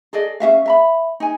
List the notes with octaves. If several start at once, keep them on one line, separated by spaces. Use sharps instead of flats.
G#4 A4 D5 D#5
C#4 G#4 E5 F5
E5 A#5 B5
D#4 G#5